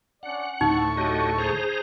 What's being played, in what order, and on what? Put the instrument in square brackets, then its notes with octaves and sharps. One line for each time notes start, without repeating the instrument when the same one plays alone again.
[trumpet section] C#4 D4 D5 [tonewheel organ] F#5
[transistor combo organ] D2 A2 C#6 [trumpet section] C4 A5 [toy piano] D#4
[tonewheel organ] F#4 G4 D#5 [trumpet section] A4 C#5 A5
[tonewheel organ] G#4 C5 A#5